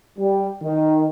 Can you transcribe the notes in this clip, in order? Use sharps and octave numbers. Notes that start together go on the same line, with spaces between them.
G3
D#3